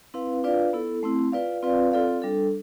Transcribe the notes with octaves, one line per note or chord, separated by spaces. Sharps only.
C4 E4 B4 F5
D4 F4 B4 D5 F5
B3 E4 A4
A3 C4 E4
F4 B4 D5 F5
C4 F4 B4 D5 F5
C4 F4 A4 D5 F5
G3 D4 A4